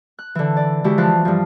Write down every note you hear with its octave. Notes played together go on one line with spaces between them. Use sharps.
F#6
D3 E3
D5
D3 G#3 E4 F#4 G4
E3 F3 F4 A5 F#6
G2 F3